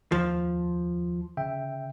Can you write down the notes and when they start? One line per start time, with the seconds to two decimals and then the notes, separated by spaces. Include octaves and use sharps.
0.12 D#2 F3
1.37 C#3 E5 G5